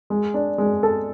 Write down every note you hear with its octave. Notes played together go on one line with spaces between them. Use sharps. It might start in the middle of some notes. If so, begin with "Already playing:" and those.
G#3
D4
G#3
A4